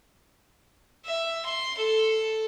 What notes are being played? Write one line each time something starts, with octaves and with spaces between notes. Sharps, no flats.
E5
C6
A4